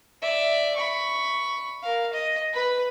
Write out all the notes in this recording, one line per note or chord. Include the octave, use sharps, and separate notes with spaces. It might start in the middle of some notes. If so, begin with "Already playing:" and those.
D5 E5
B5 C#6
A#4 F5
D#5
B4 B5